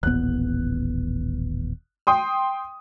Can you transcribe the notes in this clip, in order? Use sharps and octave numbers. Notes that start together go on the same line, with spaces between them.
D#1 A1 B3 F#6
G5 C6 D#6